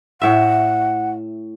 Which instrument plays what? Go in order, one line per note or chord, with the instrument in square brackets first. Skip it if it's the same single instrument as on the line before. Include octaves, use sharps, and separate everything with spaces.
[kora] A2 E5 [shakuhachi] F#5